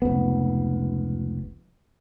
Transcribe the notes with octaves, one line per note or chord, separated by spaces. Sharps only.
F1 C#2 B3